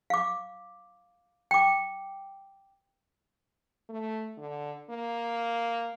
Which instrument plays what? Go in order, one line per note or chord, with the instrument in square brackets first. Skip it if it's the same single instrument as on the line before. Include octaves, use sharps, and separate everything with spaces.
[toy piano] F5 D6
G5 D6
[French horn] A3
D3
A#3